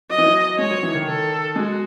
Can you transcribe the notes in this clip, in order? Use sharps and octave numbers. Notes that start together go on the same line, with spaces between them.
F#3 D#5
E3
F#3
G#3 C#5
F#3
E3
D#3
A4
G#3 F#4